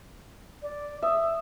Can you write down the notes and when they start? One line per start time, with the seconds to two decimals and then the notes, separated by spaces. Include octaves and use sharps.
0.62 D5
1.02 E5 D#6